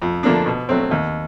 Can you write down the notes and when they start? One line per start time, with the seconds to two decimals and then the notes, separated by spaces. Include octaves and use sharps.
0.02 F2
0.23 D3 F3 A#3 D4
0.46 B2
0.69 F#3 A3 C4
0.91 D#2